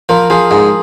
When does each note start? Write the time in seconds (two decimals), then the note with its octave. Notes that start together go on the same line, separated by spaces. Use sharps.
0.09 F3 A#4
0.30 F3 G#4
0.51 G#2 G#4